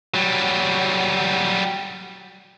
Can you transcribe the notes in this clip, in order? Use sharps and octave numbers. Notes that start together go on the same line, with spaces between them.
F#3 G3